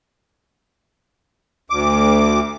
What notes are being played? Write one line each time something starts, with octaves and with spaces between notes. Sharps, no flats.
D2 D6